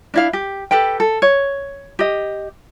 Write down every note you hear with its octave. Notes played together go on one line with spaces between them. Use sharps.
D4 E4 F5
G4
G4 A4 B4 G5
A4
C#5
G4 D#5